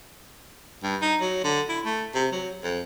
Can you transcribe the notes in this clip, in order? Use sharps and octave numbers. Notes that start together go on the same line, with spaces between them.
G2
D#4
F#3
D3
E4
A3
C3
F#3
F2